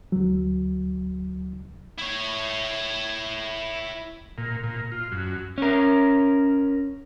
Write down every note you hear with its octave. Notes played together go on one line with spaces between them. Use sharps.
D2 F#3
E4 C#5
A#2
A#2
F4
F#2
C#4 A#4